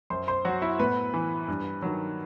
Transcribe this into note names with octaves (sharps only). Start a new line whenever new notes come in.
F#2 C5 C6
C5 C6
F#3 F#4 F#5
E4 E5
A2 B3 B4
E3
G2
D#3 F#3